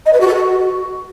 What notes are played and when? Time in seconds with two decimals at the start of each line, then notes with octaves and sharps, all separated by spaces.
0.05 D#5
0.13 B4
0.20 F#4
0.27 A4
0.34 F#4